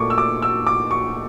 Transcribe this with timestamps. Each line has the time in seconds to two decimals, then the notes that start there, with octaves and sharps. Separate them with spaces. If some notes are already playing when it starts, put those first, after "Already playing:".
Already playing: A#2 A3 C#6 D6
0.10 E6
0.18 D6
0.42 E6
0.67 D6
0.91 C#6